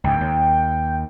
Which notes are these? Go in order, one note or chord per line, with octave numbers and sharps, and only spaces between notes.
C#2 G#2 G5
D#2